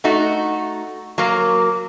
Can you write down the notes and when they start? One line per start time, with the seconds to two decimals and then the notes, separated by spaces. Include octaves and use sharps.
0.04 A3 D#4 F#4
1.18 F#3 A#3